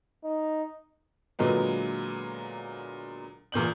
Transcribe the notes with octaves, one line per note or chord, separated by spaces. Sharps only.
D#4
A#2 D3 F#3 G#3 B3
E2 A#2 G6 F#7